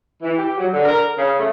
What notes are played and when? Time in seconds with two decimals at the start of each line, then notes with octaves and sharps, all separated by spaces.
0.22 E3
0.37 G4
0.57 F#3
0.73 D3
0.85 A#4
1.18 C#3
1.39 A3